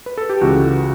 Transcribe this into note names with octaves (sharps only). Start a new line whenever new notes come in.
B4
A4
G4
C#2 C#3 E3 F#4